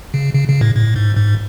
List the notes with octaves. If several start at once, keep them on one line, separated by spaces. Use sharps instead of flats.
C#3
C#3
C#3
A2
A2
G#2
G#2